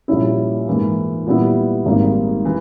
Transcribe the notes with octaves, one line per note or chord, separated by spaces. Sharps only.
A#1 A#2 G3 C#4 E4
G#2 E3 A#3
A#2 G3 B3 E4
G#1 G#2 G3 A#3
E3